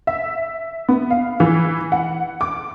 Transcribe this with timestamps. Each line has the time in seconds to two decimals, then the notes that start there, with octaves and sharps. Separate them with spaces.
0.07 E5
0.89 B3
1.10 F5
1.40 E3
1.92 F#5
2.41 D6